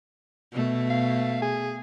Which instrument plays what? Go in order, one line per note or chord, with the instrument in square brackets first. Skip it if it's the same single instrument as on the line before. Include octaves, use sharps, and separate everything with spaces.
[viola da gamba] B2 A3
[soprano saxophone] F5
G#4